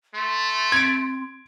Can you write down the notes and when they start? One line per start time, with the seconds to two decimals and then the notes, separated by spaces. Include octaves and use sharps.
0.14 A3 C6
0.72 C4 G#6 D7